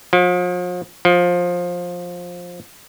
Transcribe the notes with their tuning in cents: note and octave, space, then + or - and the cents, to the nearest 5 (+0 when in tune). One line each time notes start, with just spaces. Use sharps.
F3 +40
F3 +15